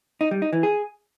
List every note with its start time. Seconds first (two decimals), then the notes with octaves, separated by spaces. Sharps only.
0.21 D#4
0.31 G3
0.42 D#4
0.53 E3
0.63 G#4